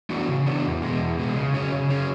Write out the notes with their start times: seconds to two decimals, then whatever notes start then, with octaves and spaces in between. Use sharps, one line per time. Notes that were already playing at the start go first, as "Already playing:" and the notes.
0.10 E3 B3 D4 F#4
0.28 C#3
0.46 E3 B3 D4 F#4
0.64 E2
0.82 B2 G#3
1.00 E2
1.18 B2 G#3
1.36 C#3
1.54 F#3 C#4 G#4 C#5
1.72 C#3
1.90 F#3 C#4 G#4 C#5